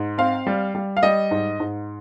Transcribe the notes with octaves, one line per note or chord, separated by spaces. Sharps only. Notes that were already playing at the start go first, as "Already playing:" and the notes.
Already playing: G#2
C4 F5
G3
G3
F5
G3 D#5
G#2
G#2